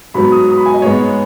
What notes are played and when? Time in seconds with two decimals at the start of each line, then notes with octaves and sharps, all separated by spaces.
0.14 G#2 F#3 B3 B5
0.32 D#6
0.49 D#6
0.57 B5
0.66 G#5
0.74 D#5
0.82 G#2 G#3 B3 C#5